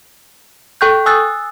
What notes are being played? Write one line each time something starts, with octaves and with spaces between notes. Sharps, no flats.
A4 G5 C#6 F#6 G6
G#5 D#6 E6 F#6 A6